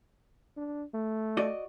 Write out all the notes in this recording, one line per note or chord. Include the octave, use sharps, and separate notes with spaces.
D4
A3
F#4 D5 D#5